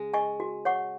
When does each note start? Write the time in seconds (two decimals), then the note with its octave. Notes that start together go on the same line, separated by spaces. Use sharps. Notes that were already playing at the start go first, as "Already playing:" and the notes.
Already playing: C#3 G#3
0.14 D#5 G#5 C#6
0.40 F#4
0.65 C#5 F#5 C#6